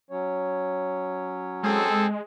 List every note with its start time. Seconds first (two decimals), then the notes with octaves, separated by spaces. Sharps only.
0.10 F#3 C#4 C#5
1.63 G#3 C4 G#4 A4